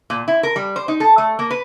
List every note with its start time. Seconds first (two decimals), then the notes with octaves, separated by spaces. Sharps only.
0.10 A#2
0.28 E4
0.43 A#4
0.56 G3
0.76 C5
0.88 D#4
1.00 A4
1.18 A3
1.39 A#3
1.51 B4